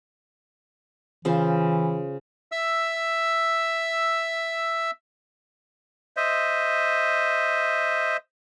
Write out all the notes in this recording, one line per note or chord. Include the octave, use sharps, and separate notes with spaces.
C#3 E3 F4 C5
E5 E6
C5 D#5 E5